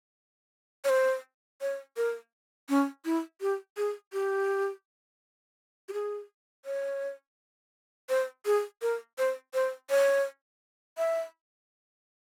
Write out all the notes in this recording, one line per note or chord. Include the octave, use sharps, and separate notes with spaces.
C#5
C5
C#5
A#4
C#4
E4
G4
G#4
G4
G4
G#4
C#5
C5
G#4
A#4
C5
C5
C#5
E5